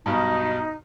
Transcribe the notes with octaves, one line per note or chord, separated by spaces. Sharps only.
B1 G2 B2 D#4